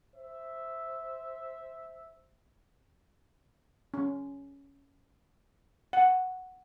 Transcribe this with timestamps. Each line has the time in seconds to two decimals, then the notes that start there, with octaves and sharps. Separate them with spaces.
0.15 C5 E5
3.94 C#4
5.93 F#5